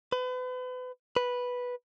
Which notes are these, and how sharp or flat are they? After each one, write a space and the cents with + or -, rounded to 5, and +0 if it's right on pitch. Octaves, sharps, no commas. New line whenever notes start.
B4 +35
B4 -5